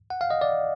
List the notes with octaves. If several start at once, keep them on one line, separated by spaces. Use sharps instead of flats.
F#5
F5
D#5
D5